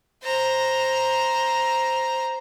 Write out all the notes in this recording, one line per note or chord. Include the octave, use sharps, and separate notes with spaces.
C5 A#5